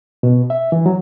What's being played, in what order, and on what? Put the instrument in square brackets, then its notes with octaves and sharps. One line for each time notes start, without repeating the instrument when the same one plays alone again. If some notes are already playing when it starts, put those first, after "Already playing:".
[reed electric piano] B2
E5
E3
F#3